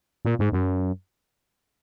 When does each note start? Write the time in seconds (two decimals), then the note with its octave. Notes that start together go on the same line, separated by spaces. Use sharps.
0.25 A#2
0.39 G#2
0.52 F#2